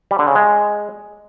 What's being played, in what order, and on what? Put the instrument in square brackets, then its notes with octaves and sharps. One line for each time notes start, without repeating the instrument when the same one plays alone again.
[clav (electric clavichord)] G3
D3
C#3
G#3